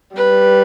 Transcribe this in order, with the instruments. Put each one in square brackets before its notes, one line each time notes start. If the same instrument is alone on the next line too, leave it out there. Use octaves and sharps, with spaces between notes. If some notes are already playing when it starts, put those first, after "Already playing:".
[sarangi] G3 [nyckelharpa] B4